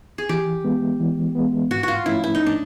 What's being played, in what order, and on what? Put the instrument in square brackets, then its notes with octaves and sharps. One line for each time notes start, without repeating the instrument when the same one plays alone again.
[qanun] G#4
[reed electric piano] E3 [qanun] G4
[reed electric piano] G#3 B3
E3
G#3 B3
[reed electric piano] G#2 [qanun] F#4
[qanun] F4 F#4
[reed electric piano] F3 A3 C#4 [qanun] E4
[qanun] E4
D#4
D4